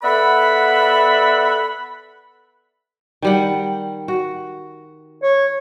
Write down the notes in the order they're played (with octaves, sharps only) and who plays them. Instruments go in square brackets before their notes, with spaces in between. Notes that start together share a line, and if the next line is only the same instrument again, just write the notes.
[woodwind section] B3 A4 D5 E5 F#5 B5
[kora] D#3 G3 F#5
F#4
[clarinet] C#5